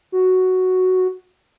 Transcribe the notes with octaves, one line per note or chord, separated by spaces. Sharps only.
F#4